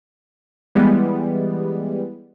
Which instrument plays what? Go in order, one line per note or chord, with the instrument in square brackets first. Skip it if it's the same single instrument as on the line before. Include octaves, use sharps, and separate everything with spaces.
[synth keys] E3 G3 G#3 B3